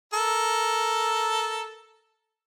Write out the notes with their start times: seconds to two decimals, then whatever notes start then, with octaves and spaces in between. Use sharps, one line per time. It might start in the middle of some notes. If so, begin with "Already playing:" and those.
0.14 A4 A#4